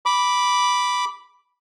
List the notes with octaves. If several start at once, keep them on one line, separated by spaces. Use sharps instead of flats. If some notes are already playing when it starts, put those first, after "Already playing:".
B5 D6